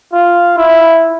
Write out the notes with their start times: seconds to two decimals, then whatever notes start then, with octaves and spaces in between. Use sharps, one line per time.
0.13 F4
0.57 E4